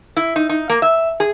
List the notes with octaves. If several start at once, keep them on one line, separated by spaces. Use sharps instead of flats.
E4
D#4
D#4
A#3
E5
G#4